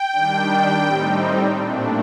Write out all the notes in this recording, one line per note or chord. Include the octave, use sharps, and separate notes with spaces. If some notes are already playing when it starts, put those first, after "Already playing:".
Already playing: G5
D#3 G3 D4
A2 G3 C4 D#4
A#2 A3 D4